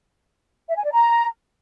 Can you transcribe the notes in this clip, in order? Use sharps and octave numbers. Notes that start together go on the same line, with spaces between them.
E5
G#5
D5
A#5